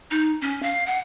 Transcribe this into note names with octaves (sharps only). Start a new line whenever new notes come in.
D#4
C#4
F5
F#5